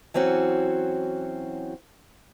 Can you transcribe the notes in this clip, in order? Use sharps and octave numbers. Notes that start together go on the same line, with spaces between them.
E3 F#3 C4 C#4 F#4